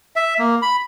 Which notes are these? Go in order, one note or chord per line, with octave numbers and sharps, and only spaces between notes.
E5
A#3
B5